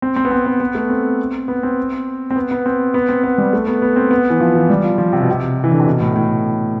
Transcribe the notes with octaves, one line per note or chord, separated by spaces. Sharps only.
C4
C4
B3
C4
B3
B3
A3
C4
B3
C4
C4
B3
B3
C4
B3
C4
B3
G3
A3
B3
B3
C4
B3
E3
F3
E3
G3
F3
F3
C3
B2
C3
E3
D3
C3
B2
A2
A2